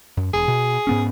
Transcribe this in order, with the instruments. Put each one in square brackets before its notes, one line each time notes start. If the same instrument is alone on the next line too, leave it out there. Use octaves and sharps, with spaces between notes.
[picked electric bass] F#2
[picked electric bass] E1 [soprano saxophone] G#4
[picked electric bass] B2
G#2 B3 C#4